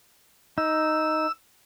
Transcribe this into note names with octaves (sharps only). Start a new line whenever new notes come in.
D#4 E6